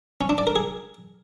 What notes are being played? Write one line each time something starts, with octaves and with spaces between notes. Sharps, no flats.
C#4
D4
D5
A#4
G#4